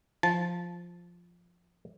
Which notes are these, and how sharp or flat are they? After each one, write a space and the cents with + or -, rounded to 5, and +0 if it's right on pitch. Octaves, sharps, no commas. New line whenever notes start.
F3 +0 A5 -15